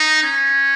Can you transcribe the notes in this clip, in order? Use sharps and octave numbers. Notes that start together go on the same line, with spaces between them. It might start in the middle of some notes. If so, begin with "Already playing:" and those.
Already playing: D#4
C#4